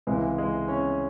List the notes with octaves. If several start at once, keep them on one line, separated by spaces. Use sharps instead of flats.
C#2 C3 E3 G#3
G#3
C#4